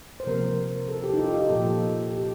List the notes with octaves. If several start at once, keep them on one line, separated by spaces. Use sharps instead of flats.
C5
C3 F3 A#3 A#4
A4
G4
D#4
F4
G4
A#2 F3 A#3 A4
G4